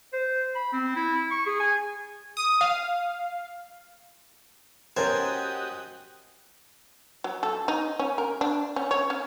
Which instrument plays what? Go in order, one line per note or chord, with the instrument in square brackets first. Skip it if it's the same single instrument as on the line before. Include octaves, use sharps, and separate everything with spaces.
[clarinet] C5
B5
C4
E4
C#6
G#4
G#5
[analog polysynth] D#6
F5
[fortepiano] C#4 A#4 [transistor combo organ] F#4 G4 D#5 [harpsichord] C5 G#5 A5
[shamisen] F#3
A4
D#4
C#4
A#4
D4
C#4
C#5
C#4